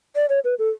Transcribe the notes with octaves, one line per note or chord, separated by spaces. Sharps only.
D5
C#5
B4
A4